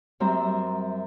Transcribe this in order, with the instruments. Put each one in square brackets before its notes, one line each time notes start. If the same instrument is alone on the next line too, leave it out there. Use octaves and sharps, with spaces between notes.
[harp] F#2 G3 C4 E5 A#5